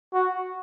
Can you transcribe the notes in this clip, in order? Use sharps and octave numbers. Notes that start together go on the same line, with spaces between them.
F#4